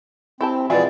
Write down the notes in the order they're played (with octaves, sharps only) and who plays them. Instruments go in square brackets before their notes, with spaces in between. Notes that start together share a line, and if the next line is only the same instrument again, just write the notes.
[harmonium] C4 [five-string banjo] E4 G4 A5
[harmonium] B2 [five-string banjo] E3 G#3 B3 [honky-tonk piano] F3 E4 G#4 [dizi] D5